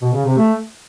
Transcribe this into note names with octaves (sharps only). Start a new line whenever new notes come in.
B2
C#3
C3
A3